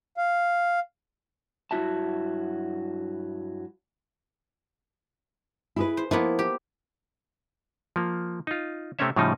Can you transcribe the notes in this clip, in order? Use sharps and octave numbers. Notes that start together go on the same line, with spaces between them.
F5
G2 F#3 E4 F#4 E5 A5
E4 G#4 B4
C5
F3 A#3 B3 E4
G4
F3 A#3
D#4 F4
C3 A3 C4 C#4 C#5 E5
A2 C#3 F3 G3 D#4